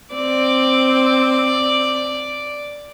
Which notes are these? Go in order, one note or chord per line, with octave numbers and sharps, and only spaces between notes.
C4 D5